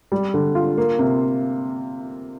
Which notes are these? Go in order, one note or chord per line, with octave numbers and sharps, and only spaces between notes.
G3
D3
F4
A#3
C3